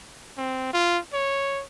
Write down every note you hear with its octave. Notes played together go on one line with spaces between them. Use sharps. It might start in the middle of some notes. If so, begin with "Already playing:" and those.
C4
F4
C#5